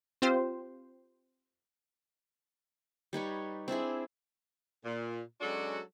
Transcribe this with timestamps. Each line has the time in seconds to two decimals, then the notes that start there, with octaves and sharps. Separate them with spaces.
0.22 C4 F4 G4 C5
3.13 G3 D#4 B4 C#5
3.68 C4 D4 E4 G#4
4.85 A#2
5.41 F#3 G#3 C#4 D4 F#4 A4